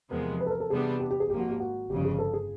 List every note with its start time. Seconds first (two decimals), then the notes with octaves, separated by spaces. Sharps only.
0.10 E2 C3 F3 G#3 B3 A#4
0.40 B4
0.46 A4
0.51 A#4
0.60 A4
0.70 C3 E3 G3 B3 D4 G#4
0.99 G4
1.11 G4
1.20 G#4
1.30 G#1 G#2 F3 A#3 G4
1.39 F#4
1.50 G4
1.60 F#4
1.89 G1 F2 C#3 G4
2.05 G#4
2.19 A4
2.33 G#4